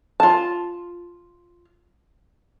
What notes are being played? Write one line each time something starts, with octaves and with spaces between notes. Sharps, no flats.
F4 A5